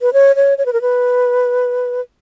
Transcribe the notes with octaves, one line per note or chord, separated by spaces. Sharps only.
B4
C#5
C#5
C#5
B4
A#4
B4